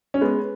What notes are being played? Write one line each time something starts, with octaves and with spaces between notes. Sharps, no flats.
C#4
G#3 B3